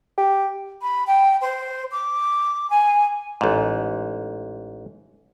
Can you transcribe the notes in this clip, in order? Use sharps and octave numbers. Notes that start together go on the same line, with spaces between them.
G4
B5
G5
C5
D6
G#5
A1 G#2